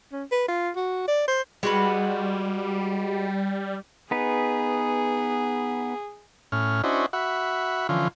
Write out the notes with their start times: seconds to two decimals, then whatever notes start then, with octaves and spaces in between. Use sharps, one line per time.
0.12 C#4
0.31 B4
0.48 F4
0.76 F#4
1.08 D5
1.28 C5
1.63 G3 G#3 F#4 B4
4.11 B3 D#4 G#4 B4
6.52 A2 C#4 F6
6.84 C#4 D4 E4 F#4 C5 D#5
7.13 F#4 E5 F#5 B5
7.89 D3 E3 F3 C#4 F4